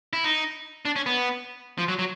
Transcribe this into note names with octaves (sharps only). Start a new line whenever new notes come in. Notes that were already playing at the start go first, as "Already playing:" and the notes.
E4
D#4
D4
C#4
B3
F3
F#3
F#3